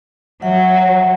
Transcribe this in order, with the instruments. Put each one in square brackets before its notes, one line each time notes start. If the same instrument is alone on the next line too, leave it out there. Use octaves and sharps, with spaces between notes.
[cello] F#3 [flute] E5 [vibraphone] F#5